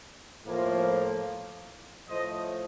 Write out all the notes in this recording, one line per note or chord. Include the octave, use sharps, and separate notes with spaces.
A2 F3 A#3
A2 F3 A3 C5 D#5